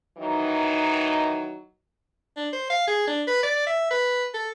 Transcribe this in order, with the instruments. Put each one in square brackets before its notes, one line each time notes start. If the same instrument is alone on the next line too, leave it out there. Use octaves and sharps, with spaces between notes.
[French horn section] D#3 E3 F#3 D#4
[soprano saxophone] D4
C5
F5
G#4
D4
B4
D5
E5
B4
A4